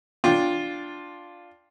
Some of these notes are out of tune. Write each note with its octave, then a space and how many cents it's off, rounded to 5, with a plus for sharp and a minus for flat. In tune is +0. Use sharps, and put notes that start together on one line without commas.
D4 +0 F4 +5 G5 +5